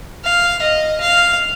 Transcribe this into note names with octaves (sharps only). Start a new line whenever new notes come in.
F5
D#5
F5